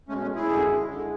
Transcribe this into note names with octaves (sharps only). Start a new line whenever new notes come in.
B2 G#3 A3 C#4
A3 C#4
E4 G#4
F#2 D3 G#3
D3 G#3